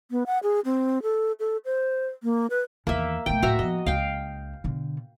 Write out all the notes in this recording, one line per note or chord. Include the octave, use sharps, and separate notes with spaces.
B3
F#5
G#4
C4
A4
A4
C5
A#3
B4
E2 D#3 A#3 E5
B1 A3 G5
D1 F#4 E5 A#5
F3 B3 D#5
C#2 F5 G5
B2 D3